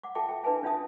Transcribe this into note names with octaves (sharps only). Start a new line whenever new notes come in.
F#5 D6
F4 A4 E5 G5 A5 D6
E5 G5
D4 E4 B4 E5 G#5 A5
C#4 D4 F4 E5 A5 D#6